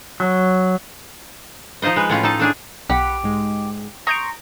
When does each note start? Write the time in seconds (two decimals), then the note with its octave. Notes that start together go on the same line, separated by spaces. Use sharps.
0.20 F#3
1.82 F3 D#4 F4 C5 D#5
1.96 G#3 B4
2.09 A2 C#4 F4
2.23 D#4 A4 A5
2.39 A3 D4 G#4
2.90 B1 G4 F#5 B5
3.24 G#2 G#3
4.07 A#5 C6 C#6 D#6 G6 D7